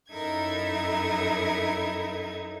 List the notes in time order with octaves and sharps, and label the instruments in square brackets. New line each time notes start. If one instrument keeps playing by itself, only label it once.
[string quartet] F#2 D#4 E4 A4 A#4 G#6